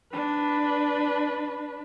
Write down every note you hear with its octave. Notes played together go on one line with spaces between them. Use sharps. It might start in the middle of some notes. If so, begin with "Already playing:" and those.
D4 B4